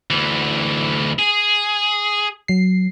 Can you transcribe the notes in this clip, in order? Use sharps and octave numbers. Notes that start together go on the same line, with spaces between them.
D2 E3
G#4
F#3 C7